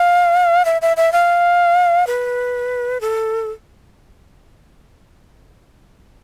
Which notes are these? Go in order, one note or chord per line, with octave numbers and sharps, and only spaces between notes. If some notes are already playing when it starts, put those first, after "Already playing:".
Already playing: F5
E5
E5
E5
F5
B4
A4